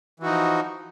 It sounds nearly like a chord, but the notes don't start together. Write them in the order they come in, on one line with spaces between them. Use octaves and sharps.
E3 F#4 D#4 F3